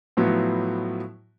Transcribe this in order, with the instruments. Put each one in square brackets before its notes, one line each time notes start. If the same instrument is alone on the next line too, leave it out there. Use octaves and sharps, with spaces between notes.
[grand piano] A2 F3 F#3 B3 E4 F#4